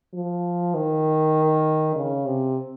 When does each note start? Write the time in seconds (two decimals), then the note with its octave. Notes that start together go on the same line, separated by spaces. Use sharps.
0.13 F3
0.74 D#3
1.96 C#3
2.26 C3